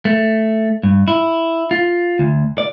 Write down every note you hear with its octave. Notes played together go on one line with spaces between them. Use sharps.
A3
G2
E4
F4
D2
D5